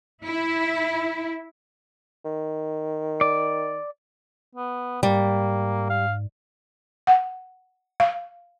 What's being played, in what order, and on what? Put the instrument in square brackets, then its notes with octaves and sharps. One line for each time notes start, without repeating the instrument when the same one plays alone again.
[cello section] E4
[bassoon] D#3
[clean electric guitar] D5
[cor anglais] B3
[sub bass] G#2 [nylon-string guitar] G3 [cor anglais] A#3
[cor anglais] F5
[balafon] F#5
F5